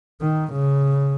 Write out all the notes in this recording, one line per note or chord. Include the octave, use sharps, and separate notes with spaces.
D#3
C#3